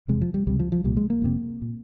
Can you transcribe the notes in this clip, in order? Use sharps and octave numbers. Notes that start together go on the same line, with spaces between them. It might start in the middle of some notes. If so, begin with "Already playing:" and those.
F1 E2 C3 G#3
F3
G3
C#2 C3 G3
F3
F3
C2 A#2 G3
G#3
A#3
F1 E2 C3
A#2